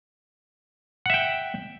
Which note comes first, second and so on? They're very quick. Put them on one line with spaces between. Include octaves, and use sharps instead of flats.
F#5 E5 G5